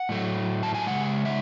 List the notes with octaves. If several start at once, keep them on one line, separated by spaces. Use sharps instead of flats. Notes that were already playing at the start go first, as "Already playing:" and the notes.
Already playing: F#5
A2 F#3 A3
A5
G#5
C#3 G#3 F#5
E5